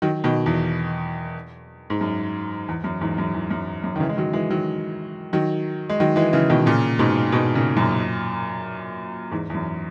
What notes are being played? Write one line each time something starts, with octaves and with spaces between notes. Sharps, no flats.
D#3 F#3
B2 D#3
E2
G#2
F#2
E2
F#2
E2 G#2
F#2
E2
F#2
F#2
D#3
C#3 E3
G#3
D#3 F#3
E3 G#3
D#3 F#3
D#3 F#3
G#3
D#3 F#3
E3 G#3
C#3 E3
B2 D#3
A#2 C#3
G#2 B2
G#2 B2
A#2 C#3
F#2 A#2
E2 G#2
E2
F#2